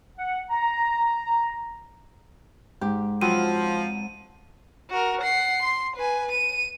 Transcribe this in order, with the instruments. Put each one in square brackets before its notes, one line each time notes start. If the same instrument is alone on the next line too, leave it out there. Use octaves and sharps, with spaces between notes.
[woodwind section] F#5
A#5
[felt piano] G#2 [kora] G4
[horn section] F3 [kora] F#3 C4 B4 [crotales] D#7
[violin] F#4 A#4
F#5 C7
C6
B4 G#5
D#7